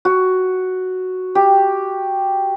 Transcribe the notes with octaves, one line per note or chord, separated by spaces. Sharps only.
F#4
G4